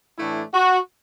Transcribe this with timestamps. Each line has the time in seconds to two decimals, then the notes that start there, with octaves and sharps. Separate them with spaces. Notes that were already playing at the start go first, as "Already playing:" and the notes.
0.19 A2 E3 A3 D4 E4
0.54 F#4